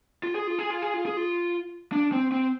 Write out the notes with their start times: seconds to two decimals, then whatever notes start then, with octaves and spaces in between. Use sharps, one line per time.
0.23 F4
0.35 G#4
0.47 F4
0.59 G#4
0.70 F4
0.82 G#4
0.94 F4
1.06 G#4
1.17 F4
1.92 D4
2.12 C4
2.32 C4